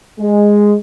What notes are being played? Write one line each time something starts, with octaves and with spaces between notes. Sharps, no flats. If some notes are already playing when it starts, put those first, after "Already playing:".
G#3